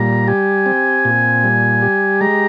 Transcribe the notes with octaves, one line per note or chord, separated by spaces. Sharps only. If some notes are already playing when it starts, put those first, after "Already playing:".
Already playing: A#2 G3 A#5
G4 G#5
C4
A#2
G3
G4
G#3 A#5